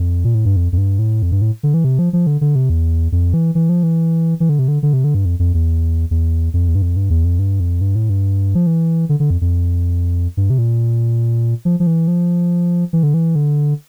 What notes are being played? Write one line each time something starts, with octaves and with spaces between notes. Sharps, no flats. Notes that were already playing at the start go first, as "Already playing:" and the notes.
Already playing: F2
A#2
A2
G2
F2
F2
G2
A2
F2
G2
A2
D3
E3
C3
F3
F3
D3
D3
C3
E2
F2
E3
E3
F3
E3
E3
D3
C3
D3
D3
C3
D3
G2
F2
F2
E2
E2
F2
E2
G2
F2
G2
E2
F2
G2
F2
G2
A2
G2
F3
E3
D3
D3
F2
F2
G2
C3
A#2
F3
F3
E3
F3
E3
D3
E3
D3